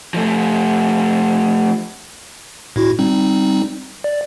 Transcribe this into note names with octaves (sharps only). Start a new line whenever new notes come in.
F3 A3
A2 E4 F#4
G3 C4 D#4
D5